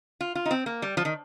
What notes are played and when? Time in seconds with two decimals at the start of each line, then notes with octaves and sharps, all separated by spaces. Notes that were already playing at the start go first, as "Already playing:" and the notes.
0.21 F4
0.35 F4
0.46 D#4
0.51 C4
0.66 A#3
0.82 G3
0.97 F3
1.05 D#3